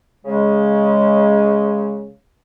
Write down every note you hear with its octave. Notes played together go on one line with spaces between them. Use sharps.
C#3 G#3